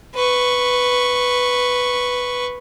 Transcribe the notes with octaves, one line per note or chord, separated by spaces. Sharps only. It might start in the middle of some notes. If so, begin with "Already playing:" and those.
B4 C#6